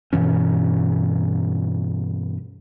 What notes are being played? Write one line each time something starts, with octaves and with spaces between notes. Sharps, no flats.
G2 B2 E3 C#4